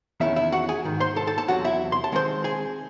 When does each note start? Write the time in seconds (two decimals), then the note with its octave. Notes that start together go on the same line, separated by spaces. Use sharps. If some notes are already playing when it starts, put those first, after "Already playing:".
0.20 E2 D#3 G#3 C#4 E4 E5
0.36 E4 E5
0.52 F#4 F#5
0.69 G#4 G#5
0.85 G#2 D#3
1.00 C5 C6
1.16 A4 A5
1.27 A4 A5
1.38 A4 A5
1.48 E2 C3 F#3 F#4 F#5
1.64 E4 E5
1.92 C6
2.04 A5
2.12 D#3 G#3 C4 C5 C6
2.44 G#4 G#5